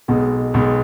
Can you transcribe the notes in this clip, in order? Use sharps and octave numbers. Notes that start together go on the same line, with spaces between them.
B1 B2 G#3
B1 B2 G#3